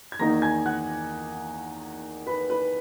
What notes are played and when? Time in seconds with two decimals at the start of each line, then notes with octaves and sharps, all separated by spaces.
0.12 G#6
0.19 E2 D#3 A#3 D#4 A#5 A#6
0.42 G#5 G#6
0.66 F#5 F#6
2.27 B4 B5
2.50 B4 B5